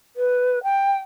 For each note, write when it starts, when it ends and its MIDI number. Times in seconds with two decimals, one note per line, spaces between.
0.16 0.59 71
0.64 0.98 79